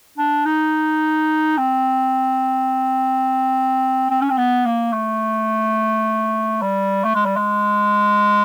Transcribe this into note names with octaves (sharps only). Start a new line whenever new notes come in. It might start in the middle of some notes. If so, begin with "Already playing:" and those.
D4
D#4
C4
C4
C#4
C4
B3
A#3
A3
G3
A3
G#3
G3
G#3